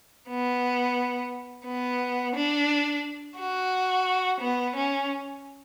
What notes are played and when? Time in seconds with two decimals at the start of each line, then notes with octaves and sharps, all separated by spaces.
0.29 B3
1.67 B3
2.36 D4
3.38 F#4
4.40 B3
4.76 C#4